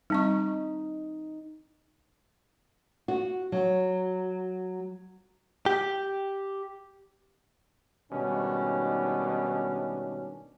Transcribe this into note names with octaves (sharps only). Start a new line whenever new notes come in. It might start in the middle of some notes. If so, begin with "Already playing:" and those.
G3 C4 D#4 C#6
F#4
F#3
G4
G#2 B2 D#3 G3 C#4 D4